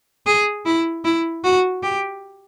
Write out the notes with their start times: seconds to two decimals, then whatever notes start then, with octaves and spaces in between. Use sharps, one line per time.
0.26 G#4
0.65 E4
1.05 E4
1.44 F#4
1.83 G4